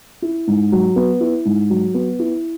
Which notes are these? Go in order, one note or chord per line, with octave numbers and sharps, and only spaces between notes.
E4
G#2
F#3
B3
E4
G#2
F#3
B3
E4